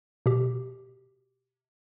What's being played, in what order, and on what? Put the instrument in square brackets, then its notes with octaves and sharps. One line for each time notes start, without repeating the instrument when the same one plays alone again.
[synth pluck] B2 G4